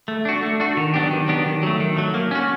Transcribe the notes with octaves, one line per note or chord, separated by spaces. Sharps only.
A3
D4 F#4
A3
D4 F#4
D#3
F#3 B3 D4 G4
D#3
F#3 B3 D4 G4
D#3
F#3 A3
D#3
F#3 A3
A#3
C#4 F#4